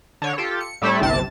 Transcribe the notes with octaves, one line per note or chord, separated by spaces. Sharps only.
D3 C#5
F4 G4 A4
C#7
A2 G3 A3 C4 E4 A4
G1 C2 C3 A5 A6